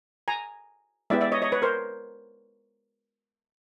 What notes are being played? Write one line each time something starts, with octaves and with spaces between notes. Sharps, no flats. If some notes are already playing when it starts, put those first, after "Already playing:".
G#5 A#5
G#3 B3 E4 G4 D5 E5
D5 E5
C#5 D#5
C#5 D#5
B4 C#5
A#4 C5